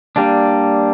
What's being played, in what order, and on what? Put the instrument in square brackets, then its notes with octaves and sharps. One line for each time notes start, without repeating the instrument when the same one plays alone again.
[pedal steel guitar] G3 A#3 D4